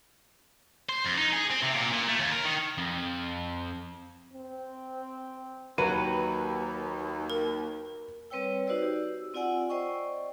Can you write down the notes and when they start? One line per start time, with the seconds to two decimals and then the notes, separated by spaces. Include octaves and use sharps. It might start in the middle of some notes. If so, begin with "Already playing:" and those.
0.89 C5
1.05 F2
1.18 D#4
1.33 G#4
1.50 C4
1.63 C3
1.75 A#2
1.93 A#2
2.08 A3
2.19 D#2
2.32 A#4
2.45 D#3
2.78 F2
4.34 C4
5.78 D#2 F#3 B4 D#7
7.30 A#4
8.30 G3 C4 B4 C#5 G5 E6
8.67 D#4 F#4 B4 C5 D5 E6
8.82 G4 E6
9.34 C4 F4 D5 F#5 G#5 E6
9.70 C5 D5 D#5 G5 C#6